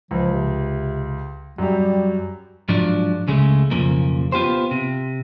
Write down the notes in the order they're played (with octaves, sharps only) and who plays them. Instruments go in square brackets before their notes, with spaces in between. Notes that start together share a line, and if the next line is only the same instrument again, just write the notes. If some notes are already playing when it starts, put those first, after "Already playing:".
[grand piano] C#2 [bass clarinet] F3
[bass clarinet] C3
[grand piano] F#2 G4 [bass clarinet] G3
[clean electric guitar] G#2 F3 F#3 D4
C#2 C#3 G#3 A3
B1 F2 C#3 F3 A#3
B3 F4 G4 C5
C3